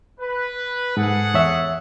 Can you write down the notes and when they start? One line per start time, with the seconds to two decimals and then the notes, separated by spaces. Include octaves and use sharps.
0.20 B4
0.97 G#2 G#4 A4 F#5
1.34 E2 C#5 E5